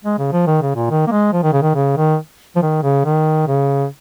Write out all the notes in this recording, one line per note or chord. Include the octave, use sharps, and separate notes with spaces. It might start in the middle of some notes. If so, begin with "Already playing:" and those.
G#3
C#3
F3
D#3
C#3
A#2
D#3
A#3
G#3
F3
D#3
C#3
D#3
C#3
D#3
F3
D#3
C#3
D#3
C#3